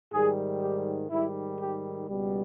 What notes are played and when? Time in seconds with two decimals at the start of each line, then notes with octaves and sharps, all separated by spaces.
0.13 G#2 D#3 G3 G#4
0.62 G4
1.11 G#2 D#3 G3 E4
1.60 G4
2.08 C#2 B2 G3